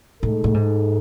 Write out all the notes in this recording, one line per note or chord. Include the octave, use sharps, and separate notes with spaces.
A2 G#3 D#4 A4
A2
G#2